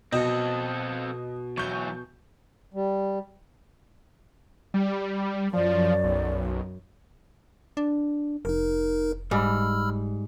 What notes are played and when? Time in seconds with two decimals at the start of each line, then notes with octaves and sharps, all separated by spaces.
0.12 B2 C4 A4 D#5
1.58 E3 F#3 C#6 G6
2.74 G3
4.74 G3
5.53 F#2 F3 D5
6.04 B1
7.77 D4
8.45 F1 D#4 A#4
9.31 G#2 G3 B5 E6 F6